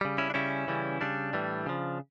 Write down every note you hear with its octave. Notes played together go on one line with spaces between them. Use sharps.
C#3 G3
C#4 E4
D4
C#3 G3 C#4 E4
C#3 E3 G3
C#3 G3 D4
A2 E3 G3
C#3 F3